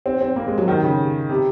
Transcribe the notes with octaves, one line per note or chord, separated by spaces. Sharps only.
C4
C4
A#3
G#3
F#3
D#3
C#3
C3